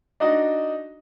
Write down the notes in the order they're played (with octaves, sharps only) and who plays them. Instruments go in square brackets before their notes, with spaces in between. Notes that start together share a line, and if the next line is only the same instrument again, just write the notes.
[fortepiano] D4 D#4 F#4 D#5